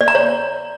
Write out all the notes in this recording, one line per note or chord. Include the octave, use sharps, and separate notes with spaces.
D5
A#5
C#5